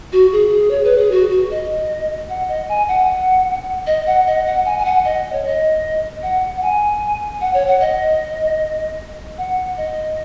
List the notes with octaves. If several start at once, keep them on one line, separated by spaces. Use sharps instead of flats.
F#4
G#4
C#5
B4
G#4
F#4
F#4
D#5
F#5
D#5
G#5
F#5
D#5
F#5
D#5
F#5
G#5
G#5
F#5
D#5
C#5
D#5
F#5
F#5
G#5
F#5
C#5
F#5
D#5
F#5
D#5